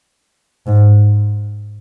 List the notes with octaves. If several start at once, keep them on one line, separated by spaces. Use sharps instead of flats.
G#2